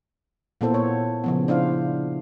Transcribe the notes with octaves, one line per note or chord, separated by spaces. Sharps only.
A#2 A#3 B3 E4 A4 C5
C#5
C#3 F3 B3
D4 E4 C5 F5